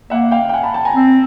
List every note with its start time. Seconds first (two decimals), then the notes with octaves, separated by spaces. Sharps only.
0.10 A#3 E5 F#5
0.31 F5 G5
0.49 G5
0.54 F#5 G#5
0.63 A5 B5
0.74 G5 A5
0.85 G#5 A#5
0.96 C4